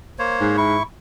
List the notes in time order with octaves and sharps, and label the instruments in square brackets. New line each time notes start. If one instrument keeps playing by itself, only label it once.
[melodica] A#3 C5 C#5
[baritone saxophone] G#2
[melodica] E4 C#6